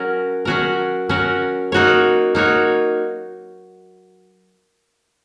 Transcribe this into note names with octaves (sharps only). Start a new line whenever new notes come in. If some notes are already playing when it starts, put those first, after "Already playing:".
Already playing: F#3 C#4 F#4 A#4
F#3 C#4 F#4 A#4
F#3 C#4 F#4 A#4
A#3 D#4 F#4 C#5
A#3 D#4 F#4 C#5